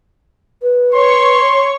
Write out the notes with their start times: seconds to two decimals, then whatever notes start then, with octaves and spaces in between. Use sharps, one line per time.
0.62 B4
0.95 C#5 C6 C#6